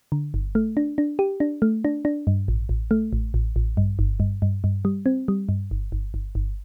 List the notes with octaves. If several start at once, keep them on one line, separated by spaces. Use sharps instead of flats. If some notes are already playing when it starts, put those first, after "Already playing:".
D3
G1
A3
D4
D4
G4
D4
A3
D4
D4
G2
A1
A1
A3
A1
A1
A1
G2
G1
G2
G2
G2
G3
C4
G3
G2
G1
G1
G1
G1